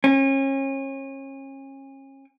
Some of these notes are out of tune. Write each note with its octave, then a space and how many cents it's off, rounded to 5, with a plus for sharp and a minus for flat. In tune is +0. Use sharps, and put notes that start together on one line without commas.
C#4 -35